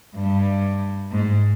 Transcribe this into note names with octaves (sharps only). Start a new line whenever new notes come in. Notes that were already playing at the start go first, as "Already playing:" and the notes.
G2
G#2